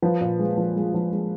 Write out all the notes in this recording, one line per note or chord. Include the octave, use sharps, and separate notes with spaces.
F3 B4
A#2
G#3
F3
G#3
F3
G#3